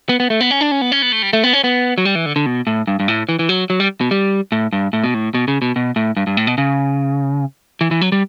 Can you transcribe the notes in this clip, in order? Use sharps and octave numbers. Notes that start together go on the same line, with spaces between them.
B3
B3
A3
B3
C#4
D4
C#4
B3
C#4
B3
A3
G3
A3
B3
C#4
B3
F#3
G3
E3
D3
D3
B2
A2
G2
G2
A2
E3
E3
F#3
F#3
G3
B2
G3
A2
G2
A2
B2
A2
B2
C#3
B2
B2
A2
G2
G2
A2
B2
C#3
E3
E3
F#3
G3